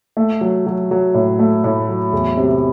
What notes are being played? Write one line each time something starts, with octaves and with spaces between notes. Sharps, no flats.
A3
F#3
F#3
F#3
A2
A3
A2
F#3
E2
C3